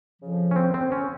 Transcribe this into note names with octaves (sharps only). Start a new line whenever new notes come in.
F2 C#3 F3
C#4
C4
C4
C#4